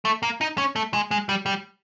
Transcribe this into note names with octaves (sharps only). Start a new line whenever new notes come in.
A3
A#3
D#4
C#4
A3
G#3
G#3
G3
G3